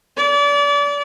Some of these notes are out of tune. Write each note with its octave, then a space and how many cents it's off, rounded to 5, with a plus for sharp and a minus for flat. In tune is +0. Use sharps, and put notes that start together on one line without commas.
D5 -35